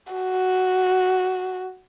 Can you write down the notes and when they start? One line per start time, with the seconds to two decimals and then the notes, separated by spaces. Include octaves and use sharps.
0.13 F#4